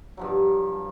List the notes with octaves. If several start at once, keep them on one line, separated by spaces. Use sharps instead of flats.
G2 F3 F#3